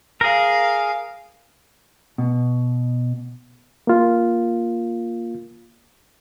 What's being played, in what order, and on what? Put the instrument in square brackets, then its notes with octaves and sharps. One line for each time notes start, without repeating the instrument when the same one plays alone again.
[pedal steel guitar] G#4 A#4 [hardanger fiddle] F5
[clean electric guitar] B2
[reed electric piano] A#3 F4